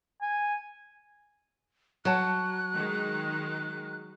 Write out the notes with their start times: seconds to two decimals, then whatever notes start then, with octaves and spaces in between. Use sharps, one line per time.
0.22 G#5
2.05 F#3 C#5 F#5 A5 F#6
2.74 D#3 G#3